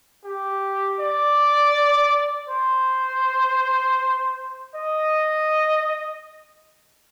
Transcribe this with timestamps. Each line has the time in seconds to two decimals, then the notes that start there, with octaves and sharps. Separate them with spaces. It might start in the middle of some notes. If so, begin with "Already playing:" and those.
0.24 G4
1.00 D5
2.49 C5
4.75 D#5